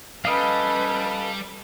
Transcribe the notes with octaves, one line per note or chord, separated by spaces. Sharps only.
G3 C#4 A4 B4 D#5 F5